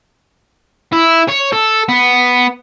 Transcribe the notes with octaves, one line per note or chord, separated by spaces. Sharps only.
E4
C#5
A4
B3